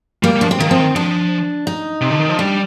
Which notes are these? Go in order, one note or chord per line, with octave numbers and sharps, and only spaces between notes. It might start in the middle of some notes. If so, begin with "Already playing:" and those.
G3 A#3
G3
F3 D4
C4
D#3 A#3
F3 C4
D#3
F3 D4
D#4
C3
D3
D#3
F3
G3 D4